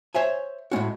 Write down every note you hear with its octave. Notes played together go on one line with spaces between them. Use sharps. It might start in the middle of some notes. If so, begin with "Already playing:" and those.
C5 C#5 E5 G#5
A2 G#3 C#4 F#4